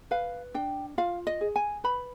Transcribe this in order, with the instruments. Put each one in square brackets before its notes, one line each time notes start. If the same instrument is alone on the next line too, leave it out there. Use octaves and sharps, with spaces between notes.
[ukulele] B4 F5
D4 G5
F4 F5
D#5
G#4
G#5
B4 B5